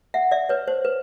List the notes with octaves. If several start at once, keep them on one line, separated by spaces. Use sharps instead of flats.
E5 F#5
D5 E5
B4 C#5
C5
B4